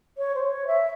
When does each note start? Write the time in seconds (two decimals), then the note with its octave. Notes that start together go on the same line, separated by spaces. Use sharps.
0.18 C#5
0.35 C5
0.46 C#5
0.67 E5